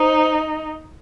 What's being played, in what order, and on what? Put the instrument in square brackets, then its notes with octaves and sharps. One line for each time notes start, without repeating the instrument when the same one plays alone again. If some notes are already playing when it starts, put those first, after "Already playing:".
Already playing: [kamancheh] D#4 [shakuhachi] C5